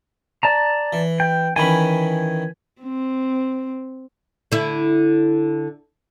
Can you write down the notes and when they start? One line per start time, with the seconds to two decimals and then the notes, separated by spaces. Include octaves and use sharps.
0.43 D5 A5 A#5
0.93 E3
1.20 G5
1.56 D#3 E3 C#4 G#5 B5
2.82 C4
4.52 D3 E4